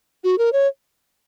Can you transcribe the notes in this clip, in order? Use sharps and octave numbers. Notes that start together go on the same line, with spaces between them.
F#4
A#4
C#5